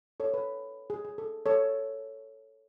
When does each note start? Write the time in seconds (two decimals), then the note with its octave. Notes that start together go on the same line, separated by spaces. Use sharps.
0.20 A4 C#5
0.34 B4
0.90 G#4
1.05 G#4
1.18 A4
1.46 A4 C#5